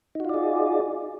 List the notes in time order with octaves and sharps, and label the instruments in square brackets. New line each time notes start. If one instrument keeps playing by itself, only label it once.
[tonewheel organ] D#4
F#4
F4
D5
G#4